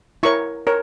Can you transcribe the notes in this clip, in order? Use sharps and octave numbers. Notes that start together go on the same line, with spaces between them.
E4 A#4 C#5 C#6
A#4 C#5